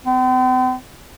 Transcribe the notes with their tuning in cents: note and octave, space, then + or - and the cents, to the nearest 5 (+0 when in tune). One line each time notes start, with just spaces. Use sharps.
C4 -45